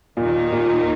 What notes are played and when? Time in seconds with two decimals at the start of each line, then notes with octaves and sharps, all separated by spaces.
0.17 D#2 A#2 D#3 A#3 D#4
0.52 A#2